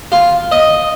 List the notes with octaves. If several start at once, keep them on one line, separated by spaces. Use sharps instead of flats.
F4
D#5